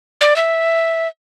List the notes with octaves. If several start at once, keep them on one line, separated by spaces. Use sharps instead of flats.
D5
E5